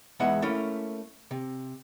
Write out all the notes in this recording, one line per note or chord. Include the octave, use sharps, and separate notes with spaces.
E2 G#3 B3 D#4 E5 F#5
A3 A#3 C#4 E4
C3